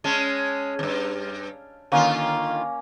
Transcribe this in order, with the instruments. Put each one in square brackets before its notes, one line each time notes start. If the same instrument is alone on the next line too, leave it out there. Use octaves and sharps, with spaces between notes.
[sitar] G#3 C#4 [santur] A5
[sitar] E2 G2
[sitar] D3 D#3 F4 [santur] A#3 C#4